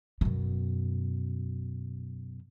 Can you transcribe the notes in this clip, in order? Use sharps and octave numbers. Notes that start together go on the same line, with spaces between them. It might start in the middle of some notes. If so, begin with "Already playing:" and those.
F#2 B2